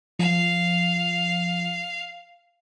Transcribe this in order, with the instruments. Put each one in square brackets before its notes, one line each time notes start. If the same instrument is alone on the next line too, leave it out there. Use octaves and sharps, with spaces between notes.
[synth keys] F3 [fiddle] F5